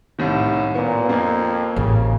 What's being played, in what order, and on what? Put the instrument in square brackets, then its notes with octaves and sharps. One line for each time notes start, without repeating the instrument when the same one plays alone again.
[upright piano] C2 A2 D#3
[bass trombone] A#2 [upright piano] B3
[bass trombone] F2 [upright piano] A#3
[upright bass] A1 [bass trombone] C#3